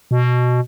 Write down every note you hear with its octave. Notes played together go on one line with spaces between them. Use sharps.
B2